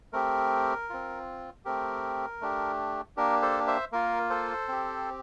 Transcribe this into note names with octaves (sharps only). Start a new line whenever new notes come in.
A3 C4 G4 A#4
C4 F4
A3 C4 G4 A#4
A3 D4 G4
A#3 D4 G4 A#4
A4 C5
C5 E5
A#3 F4 A#4
A4 C5
C4 G4